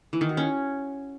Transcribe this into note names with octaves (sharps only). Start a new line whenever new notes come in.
E3
D#3
F#4
C#4